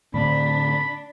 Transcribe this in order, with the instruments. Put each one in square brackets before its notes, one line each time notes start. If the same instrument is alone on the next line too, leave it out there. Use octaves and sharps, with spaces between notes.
[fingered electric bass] A2 D3 C4 [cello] D4 [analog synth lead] B5